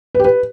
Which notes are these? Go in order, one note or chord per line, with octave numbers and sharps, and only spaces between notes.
B4
G4
B4